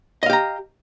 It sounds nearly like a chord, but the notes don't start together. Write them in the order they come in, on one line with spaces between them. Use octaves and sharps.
D#5 F5 G4 A#5